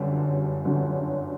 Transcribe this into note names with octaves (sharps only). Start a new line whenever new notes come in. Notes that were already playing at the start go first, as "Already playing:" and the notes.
Already playing: G1 F#2 D3 F#3 G3
G1 F#2 D3 F#3